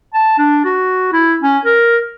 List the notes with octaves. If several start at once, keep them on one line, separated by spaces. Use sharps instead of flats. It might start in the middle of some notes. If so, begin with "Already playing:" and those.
A5
D4
F#4
E4
C#4
A#4